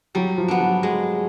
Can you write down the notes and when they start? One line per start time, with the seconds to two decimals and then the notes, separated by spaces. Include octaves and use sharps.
0.15 F#3 G3
0.38 F3
0.48 B3 D4
0.60 F#3
0.83 G#3